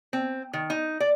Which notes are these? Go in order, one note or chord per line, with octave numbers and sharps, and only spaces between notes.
C4
D#3
D#4
D5